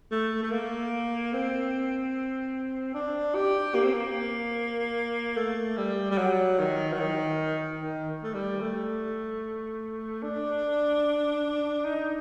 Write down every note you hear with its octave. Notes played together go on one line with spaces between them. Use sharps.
A3
A3
A#3
C4
D4
G4
A#3
C4
A#3
A3
G3
G3
F#3
D#3
F#3
D#3
D#3
A3
G3
A3
D4
D#4